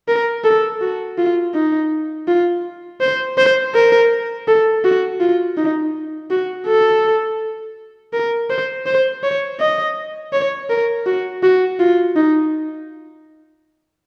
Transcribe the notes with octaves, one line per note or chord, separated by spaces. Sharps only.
A#4
A4
F#4
F4
D#4
F4
C5
C5
A#4
A4
F#4
F4
D#4
F#4
A4
A#4
C5
C5
C#5
D#5
C#5
A#4
F#4
F#4
F4
D#4